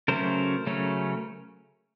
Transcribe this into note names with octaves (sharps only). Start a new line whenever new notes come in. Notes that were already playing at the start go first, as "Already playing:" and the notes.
C#3 F#3 A3 C#4 A#4 C5
C#3 F#3 A3 C#4